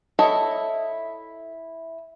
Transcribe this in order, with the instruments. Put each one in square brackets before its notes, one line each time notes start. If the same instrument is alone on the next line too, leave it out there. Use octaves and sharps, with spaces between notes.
[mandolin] E4 [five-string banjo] A4 C#5 D#5